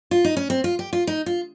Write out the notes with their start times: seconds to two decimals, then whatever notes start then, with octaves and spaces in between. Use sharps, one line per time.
0.11 F4
0.25 D#4
0.37 C#4
0.50 C4
0.64 F4
0.79 G4
0.93 F4
1.07 D#4
1.26 F4